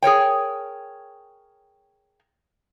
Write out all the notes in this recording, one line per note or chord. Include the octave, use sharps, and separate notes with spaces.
G#4 A#4 C#5 G5